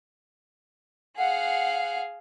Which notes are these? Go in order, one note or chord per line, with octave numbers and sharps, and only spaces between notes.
G#4 F5 F#5